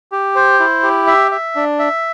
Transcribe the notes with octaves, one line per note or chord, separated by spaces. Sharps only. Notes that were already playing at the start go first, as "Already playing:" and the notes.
G4
C5
E4
G4
E5
E5
D4
E5